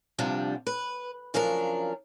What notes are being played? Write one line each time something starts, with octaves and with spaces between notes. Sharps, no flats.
D2 G2 C3 F3 G3 D4
B4
C#3 F3 F#3 D4 A#4